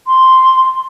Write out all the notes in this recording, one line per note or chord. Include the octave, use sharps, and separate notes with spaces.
C6